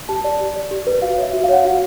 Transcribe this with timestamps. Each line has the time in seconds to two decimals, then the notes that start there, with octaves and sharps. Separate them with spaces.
0.09 G4 A5
0.24 D5
0.40 G4
0.56 D5
0.71 G4
0.87 B4
1.02 F#4 F5
1.17 C#5
1.22 E5
1.34 F#4
1.44 F5
1.49 C#5 F#5
1.62 F#4 F5